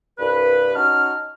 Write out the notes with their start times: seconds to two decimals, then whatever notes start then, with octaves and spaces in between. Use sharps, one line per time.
0.19 C2 G2 B4
0.75 C#4 D#4 F#4 A5 F6